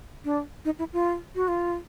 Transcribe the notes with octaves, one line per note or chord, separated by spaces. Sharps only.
D4
D#4
E4
F4
F#4
F4